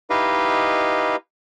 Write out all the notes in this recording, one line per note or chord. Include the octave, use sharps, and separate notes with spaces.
D#4 E4 G4 B4 D#5 F5